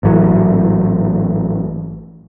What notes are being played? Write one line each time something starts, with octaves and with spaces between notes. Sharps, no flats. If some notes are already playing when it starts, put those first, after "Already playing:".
A1 G#2 E3 F#3